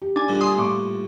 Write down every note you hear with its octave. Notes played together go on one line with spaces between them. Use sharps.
G4
D4 G#5
G2 A#2 D3
G#5 C6 D#6
A2 C#6 D6